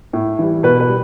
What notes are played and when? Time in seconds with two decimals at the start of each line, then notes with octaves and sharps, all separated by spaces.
0.13 A2
0.39 E3 G3
0.63 B2 B4
0.80 B4
0.88 G3